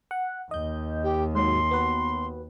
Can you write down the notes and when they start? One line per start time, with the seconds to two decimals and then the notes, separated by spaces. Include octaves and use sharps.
0.11 F#5
0.51 D#2 D#5 G6
1.03 G4
1.35 G#2 F#3 C6
1.71 B3 F#4 B4